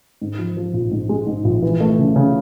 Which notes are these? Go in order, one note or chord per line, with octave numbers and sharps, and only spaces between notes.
G#2
F3
F3
A#1
G#2
G#3
G#2
A#1
E3
A3
C#3
C#3